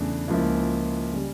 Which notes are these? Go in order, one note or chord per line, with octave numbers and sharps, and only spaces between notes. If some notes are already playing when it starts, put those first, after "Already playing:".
Already playing: E2 C#3 E3 A3 D4
C#2 C#3 F3 A#3 E4
C#3 G3